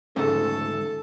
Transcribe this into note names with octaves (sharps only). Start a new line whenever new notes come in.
D2 G#2 C#3 A3 A4